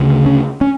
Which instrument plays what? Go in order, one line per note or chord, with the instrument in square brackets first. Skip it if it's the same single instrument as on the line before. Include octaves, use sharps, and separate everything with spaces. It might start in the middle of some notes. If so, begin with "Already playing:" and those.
Already playing: [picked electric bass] D2 C#3
C#4
C#4